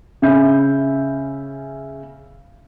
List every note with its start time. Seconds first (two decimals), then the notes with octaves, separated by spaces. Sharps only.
0.22 C#3 C#4 E5 B5 G6